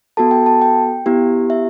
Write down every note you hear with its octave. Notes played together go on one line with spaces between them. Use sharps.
B3 F#4 A4 A5
G5
A5
G5
B3 E4 G4
E5